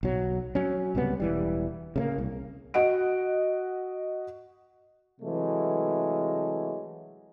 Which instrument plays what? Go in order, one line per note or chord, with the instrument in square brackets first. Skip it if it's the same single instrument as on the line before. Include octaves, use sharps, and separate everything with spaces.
[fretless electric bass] B1 F#3
F#3 C#4
C#2 C3 G3 B3
E1 E3 G3
C#3 A3 A#3
C2
[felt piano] F#4 D#5 F#5 D7
[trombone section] C3 E3 F#3 G#3 A3